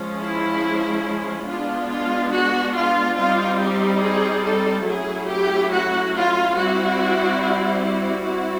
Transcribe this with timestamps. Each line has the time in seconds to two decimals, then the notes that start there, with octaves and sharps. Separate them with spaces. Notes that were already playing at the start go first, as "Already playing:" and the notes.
Already playing: F3 G#3 C#4
0.19 E4
1.45 G#3 B3 D4 F4
1.88 F4
2.30 F#4
2.73 F4
3.15 G3 C4 D#4 F4
3.58 G4
4.00 G#4
4.43 A4
4.85 F#3 A3 C#4 E4 G#4
5.28 G4
5.69 F#4
6.13 F4
6.55 G3 C4 E4 F#4
7.82 F#4
8.25 G3 C4 E4